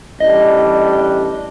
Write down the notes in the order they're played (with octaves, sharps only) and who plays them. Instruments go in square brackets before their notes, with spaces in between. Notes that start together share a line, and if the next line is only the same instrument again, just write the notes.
[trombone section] A1 G3 D4 [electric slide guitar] D#5